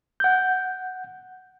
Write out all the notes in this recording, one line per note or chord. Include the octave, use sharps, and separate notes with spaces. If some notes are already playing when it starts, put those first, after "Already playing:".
F#5 G6